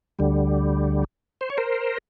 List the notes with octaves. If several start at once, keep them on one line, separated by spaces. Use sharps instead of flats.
D2 D3 G3
C5
C#5
A#4 C5